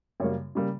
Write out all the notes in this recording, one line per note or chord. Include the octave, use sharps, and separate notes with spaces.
F#2 C#3 G3 A#3 C#5
C#3 G3 A#3